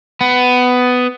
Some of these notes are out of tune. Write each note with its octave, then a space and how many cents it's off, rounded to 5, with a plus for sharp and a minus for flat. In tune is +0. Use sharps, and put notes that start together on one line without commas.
B3 +15